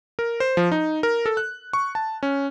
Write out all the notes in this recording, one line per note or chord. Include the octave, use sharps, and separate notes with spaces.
A#4
C5
F3
D#4
A#4
A4
F#6
C#6
A5
C#4